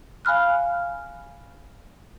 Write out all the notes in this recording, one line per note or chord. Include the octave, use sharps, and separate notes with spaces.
F5 G#5 B5 F6 F#6